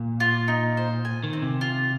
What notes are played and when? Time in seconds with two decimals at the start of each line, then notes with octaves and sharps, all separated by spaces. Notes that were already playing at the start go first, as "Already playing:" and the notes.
Already playing: A#2
0.20 F4
0.48 D#4
0.77 C5
1.05 G#5
1.24 D#3
1.33 C4
1.42 C3
1.61 F4